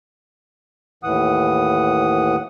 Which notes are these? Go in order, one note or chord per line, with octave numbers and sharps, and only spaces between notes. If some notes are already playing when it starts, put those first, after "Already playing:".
D#2 A2 E3 F#5 D#6